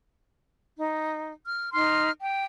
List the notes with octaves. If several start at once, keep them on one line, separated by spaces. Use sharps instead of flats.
D#4
F6
D#4 C6 F6
G5